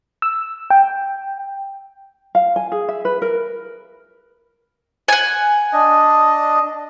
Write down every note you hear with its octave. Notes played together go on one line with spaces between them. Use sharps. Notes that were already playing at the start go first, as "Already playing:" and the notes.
E6
G5
F5
G#5
G#4
E5
B4
A#4
F#5 G#5
D4 D#5